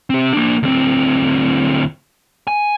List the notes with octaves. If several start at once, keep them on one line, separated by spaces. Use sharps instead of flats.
C4 G4
A#3 D4
D2 C4
G#5